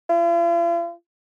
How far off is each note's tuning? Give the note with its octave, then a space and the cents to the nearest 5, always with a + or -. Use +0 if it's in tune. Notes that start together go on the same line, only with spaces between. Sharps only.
F4 -45